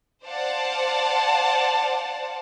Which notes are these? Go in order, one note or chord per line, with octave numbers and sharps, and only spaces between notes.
C5 D5 F5 F#5 A5